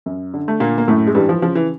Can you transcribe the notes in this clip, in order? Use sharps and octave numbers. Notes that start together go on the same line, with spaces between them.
F#2
D3
A3
A#2 D3 A#3
A#3
F#2 A2 A3
G#3
G2 E3 G3
F3
C#3 F3
E3